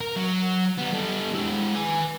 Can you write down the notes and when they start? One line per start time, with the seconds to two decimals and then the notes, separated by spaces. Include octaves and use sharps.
0.01 A#4
0.16 F#3
0.78 G3 B3
0.93 G3 A4
1.34 G#3 E4
1.75 B4 G#5